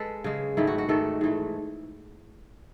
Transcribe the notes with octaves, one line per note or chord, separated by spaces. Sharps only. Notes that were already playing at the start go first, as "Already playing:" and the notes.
Already playing: G#3 A4 B4
C#3 G#3
G#2 D#3 A3 E4
F#4
F#4
G#2 D#3 A3 A4
G#2 E3 A3